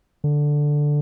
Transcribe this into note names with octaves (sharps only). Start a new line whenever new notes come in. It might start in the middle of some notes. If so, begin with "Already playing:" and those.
D3